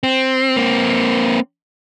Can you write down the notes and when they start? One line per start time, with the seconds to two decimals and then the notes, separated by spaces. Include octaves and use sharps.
0.03 C4
0.56 A#3 C4